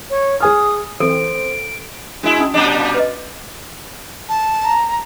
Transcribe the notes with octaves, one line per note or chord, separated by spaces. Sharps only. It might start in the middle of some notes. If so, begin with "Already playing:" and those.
C#5
G#4 G#5 D#6 F6
E3 C4 A4 C5 D7
G#3 D4 E4 F#4
C#4 D#4 D#6
A#2 G3 D4 D#5
F#4 F5 A5
B4 D5 D#5
A5
A#5